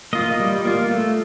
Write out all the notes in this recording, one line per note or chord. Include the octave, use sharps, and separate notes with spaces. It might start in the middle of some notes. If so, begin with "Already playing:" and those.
A#3 F4 D#5
G3
A#3 F4
A3